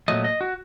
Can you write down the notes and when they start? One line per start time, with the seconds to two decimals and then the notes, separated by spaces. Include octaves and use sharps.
0.08 A#2 F#3 A3 D#5
0.24 D#5
0.41 F#4